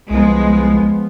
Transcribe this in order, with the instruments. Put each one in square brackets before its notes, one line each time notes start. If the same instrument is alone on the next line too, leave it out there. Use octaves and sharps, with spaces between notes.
[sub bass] C2 [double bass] F3 B3 [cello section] G#3